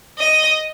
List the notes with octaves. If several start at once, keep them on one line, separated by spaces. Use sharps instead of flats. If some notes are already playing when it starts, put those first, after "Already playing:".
D#5